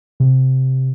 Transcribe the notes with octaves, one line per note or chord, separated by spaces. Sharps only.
C3